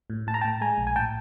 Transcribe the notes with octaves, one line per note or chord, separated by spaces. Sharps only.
A2
A2 A5
A#5
A2 G5 A5
G#3 G#5 A#5
A#1
G#5
A2 G5 A5